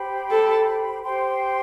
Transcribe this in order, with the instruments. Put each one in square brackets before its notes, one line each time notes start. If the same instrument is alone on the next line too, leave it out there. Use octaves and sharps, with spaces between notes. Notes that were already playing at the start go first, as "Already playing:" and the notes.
Already playing: [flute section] G4 C5 G5 B5
[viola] A4
[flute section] G4 C5 G5 C6